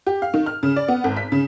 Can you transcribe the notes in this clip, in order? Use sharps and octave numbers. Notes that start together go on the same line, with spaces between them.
G4
F5
D#3
F6
C#3
D5
B3
G#1
B6
C#3